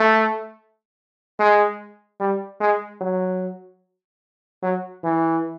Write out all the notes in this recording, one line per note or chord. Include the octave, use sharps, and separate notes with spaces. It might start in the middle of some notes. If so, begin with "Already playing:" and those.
Already playing: A3
G#3
G3
G#3
F#3
F#3
E3